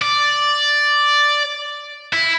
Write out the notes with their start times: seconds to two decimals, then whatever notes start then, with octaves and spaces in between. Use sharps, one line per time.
0.02 D5
2.13 E4